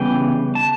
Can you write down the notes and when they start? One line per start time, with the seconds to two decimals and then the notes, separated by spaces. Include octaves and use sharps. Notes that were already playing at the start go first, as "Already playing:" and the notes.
Already playing: C#3 E3 G3 B3 G5
0.55 A5